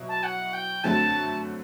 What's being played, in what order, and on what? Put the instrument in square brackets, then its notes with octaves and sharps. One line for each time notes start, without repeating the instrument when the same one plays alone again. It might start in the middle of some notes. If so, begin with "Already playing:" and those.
Already playing: [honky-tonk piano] B2 F#3 E4
[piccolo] A5
F#5
G5
[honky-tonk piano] D3 F#3 A3 C4 F#4 [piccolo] A5